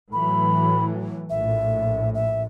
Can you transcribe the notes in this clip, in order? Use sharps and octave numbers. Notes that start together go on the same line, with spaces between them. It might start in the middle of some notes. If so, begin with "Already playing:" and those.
A2 E3 F#3 B5
A#1 A2 E5
E5